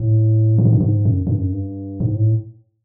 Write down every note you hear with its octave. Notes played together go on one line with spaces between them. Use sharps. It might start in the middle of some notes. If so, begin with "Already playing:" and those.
Already playing: A2
A2
G#2
G2
G#2
F#2
G2
F#2
G2
G#2
A2